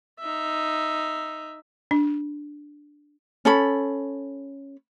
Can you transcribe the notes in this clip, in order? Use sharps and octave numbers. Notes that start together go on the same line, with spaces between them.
D#4 E5
D4
C#4 A4 B5